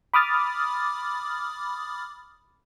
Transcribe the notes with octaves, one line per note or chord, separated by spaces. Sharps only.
B5 D6 D#6 F6 A6